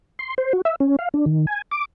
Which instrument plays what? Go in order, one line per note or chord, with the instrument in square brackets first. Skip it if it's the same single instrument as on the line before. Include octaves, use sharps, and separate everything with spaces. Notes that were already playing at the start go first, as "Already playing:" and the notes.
[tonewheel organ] C6
C5
F#4
E5
C#4
F5
D4
D#3
G#5
D6